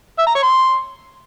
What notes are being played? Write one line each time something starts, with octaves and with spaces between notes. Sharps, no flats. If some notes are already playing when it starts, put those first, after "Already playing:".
E5
A#5
C#5
C6